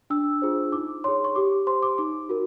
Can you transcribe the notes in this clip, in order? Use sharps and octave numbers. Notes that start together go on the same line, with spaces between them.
D4 E6
F4 G#4 C5
D#4 D6
G#4 C#5 C6
C#6
G4 D6
C5 C6
D6
D#4 D6
F#4 A#4